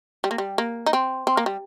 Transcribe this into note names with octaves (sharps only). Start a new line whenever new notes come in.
G3
A#3
G3
A#3
D#4
C4
C4
A#3
G3